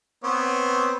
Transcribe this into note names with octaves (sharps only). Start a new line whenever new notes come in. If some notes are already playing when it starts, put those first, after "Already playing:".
B3 C4 C#5